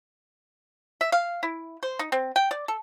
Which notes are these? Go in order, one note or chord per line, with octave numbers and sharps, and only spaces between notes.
E5
F5
E4
C5
D#4
C4
G5
D5
A4